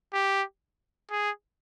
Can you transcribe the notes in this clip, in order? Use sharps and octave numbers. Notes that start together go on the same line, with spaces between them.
G4
G#4